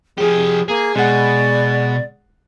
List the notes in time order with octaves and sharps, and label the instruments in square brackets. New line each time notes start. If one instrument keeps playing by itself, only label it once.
[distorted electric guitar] F3 G4 [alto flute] G#4
[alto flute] A#3 [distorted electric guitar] G#4
[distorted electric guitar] B2 [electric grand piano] G#3 F#5 [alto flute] D5